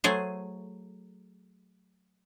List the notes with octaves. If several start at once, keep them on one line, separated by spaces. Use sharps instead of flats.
F#3 A3 G#4 C5